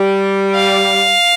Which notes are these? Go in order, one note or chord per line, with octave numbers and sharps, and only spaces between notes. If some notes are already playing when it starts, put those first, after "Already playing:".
Already playing: G3
F5